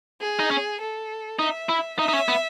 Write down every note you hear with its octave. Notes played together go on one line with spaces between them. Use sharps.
G#4
D#4
C#4
A4
D#4 E5
E4
D#4 E5
D#4
C#4
B3